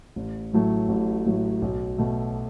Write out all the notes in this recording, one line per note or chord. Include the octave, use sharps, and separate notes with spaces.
A1
A2 F#3 A3
A1
A2 F#3 A3
B1
B2 A3